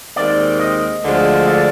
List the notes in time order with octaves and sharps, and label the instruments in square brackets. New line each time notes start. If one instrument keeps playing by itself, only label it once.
[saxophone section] D#2 D#3 G#3 C4 [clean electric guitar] D5
[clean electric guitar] D#5
[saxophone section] D2 D3 F3 G#3
[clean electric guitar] D5